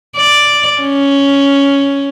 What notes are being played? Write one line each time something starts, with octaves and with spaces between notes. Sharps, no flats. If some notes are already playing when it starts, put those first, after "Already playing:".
D5
C#4